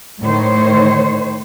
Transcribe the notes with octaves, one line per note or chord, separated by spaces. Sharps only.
A2 D#3 C5 C#5